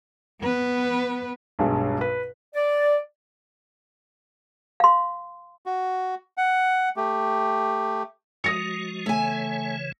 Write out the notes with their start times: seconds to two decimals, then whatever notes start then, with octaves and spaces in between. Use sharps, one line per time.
0.41 B3 B4
1.59 B1 G2 G#3
2.01 B4
2.55 D5
4.80 F5 C6
5.66 F#4
6.37 F#5
6.96 A3 G4
8.44 F3 G#3 F#4 D#6 A#6 C#7
9.06 C#3 E3 A3 C#5 G#5